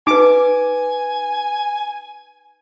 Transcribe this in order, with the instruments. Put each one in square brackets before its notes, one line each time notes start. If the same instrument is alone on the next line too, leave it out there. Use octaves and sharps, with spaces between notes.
[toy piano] D#4 B4 [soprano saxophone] G#5 [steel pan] D6